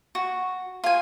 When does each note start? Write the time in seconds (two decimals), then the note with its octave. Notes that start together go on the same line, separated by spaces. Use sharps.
0.15 F#4
0.84 F4 G#5